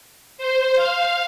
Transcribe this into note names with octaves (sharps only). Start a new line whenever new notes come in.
C5
F5